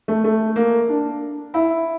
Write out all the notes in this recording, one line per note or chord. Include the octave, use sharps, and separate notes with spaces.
A3
A3
A#3
D4
E4